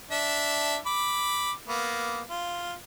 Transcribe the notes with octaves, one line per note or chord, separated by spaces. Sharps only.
D4 E5
B5 D6
A#3 B3
F4